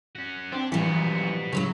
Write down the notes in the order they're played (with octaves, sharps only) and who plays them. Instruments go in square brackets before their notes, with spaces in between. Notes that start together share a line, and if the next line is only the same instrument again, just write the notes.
[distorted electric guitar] C#4 F#4
[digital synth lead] C4 [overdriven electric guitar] D4
[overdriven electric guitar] F#2 A#2 [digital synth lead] E3 [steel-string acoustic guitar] F3 G3 [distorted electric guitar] B3 F#4
[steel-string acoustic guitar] F#2 A3 E4 [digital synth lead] C#3 [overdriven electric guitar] F#3